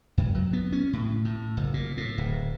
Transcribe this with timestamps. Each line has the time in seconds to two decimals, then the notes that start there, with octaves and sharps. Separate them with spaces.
0.18 F#2
0.35 F#3
0.53 B3
0.72 C#4
0.93 A2
1.25 A2
1.57 F#1
1.74 A#2
1.97 A2
2.18 D1